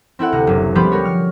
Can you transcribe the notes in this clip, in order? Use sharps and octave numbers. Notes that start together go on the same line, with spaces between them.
C4 E4 A4 F#5
D2 C3 A#5 F6
F#1
F3 G3 B3 G4 B4 C5
F#4 A#4 C#5
F6